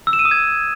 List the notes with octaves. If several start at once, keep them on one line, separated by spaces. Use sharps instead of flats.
E6
E7
D#7
D#6
G#6